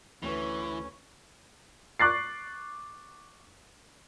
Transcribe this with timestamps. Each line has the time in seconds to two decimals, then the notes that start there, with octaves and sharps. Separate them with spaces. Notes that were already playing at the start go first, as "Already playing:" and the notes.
0.23 D2 E3 C#4 B4
2.00 C#6 D6 F#6 A6 C7